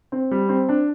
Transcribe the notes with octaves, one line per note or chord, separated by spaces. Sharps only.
C4
G3
C4
D4